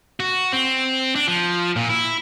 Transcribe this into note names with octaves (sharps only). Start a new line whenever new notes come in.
F#4
C4
D4
F3
A#2
E4